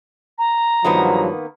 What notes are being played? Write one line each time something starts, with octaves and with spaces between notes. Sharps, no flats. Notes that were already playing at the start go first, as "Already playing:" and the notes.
A#5
G2 D#3 F3 F#3 A#3 B3